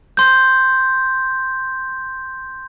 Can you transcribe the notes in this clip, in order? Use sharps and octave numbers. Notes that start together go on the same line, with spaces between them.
C6 G6